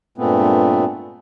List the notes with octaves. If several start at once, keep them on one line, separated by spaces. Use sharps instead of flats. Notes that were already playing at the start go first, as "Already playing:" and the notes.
G2 A#2 G#3 A3 B3 C4